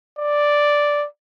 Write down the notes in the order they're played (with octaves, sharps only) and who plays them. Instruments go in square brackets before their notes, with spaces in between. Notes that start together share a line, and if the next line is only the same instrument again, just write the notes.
[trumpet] D5